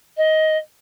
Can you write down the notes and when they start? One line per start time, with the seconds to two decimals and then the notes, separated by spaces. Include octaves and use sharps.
0.17 D#5